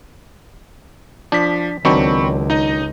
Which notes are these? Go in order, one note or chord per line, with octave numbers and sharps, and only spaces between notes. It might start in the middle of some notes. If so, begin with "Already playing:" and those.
F3 D4 B6
C#2 D#3 F#3 C4 D4 B5 C#6
D#4 D#5